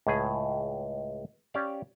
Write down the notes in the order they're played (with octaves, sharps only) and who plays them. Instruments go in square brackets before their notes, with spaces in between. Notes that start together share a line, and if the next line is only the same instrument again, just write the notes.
[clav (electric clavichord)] C#2 A2 G#4
C#4 G4 D5 F5